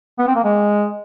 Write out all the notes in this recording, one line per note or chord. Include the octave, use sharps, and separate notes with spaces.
B3
C4
A#3
G#3